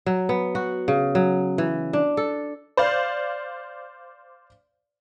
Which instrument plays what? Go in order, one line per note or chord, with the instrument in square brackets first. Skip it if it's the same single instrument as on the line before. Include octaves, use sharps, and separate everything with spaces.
[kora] F#3
B3
F#4
C#3
F#3
E3
D4
A4
[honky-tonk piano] C5 D5 F5